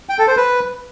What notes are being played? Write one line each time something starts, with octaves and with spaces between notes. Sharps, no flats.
G5
A4
C5
B4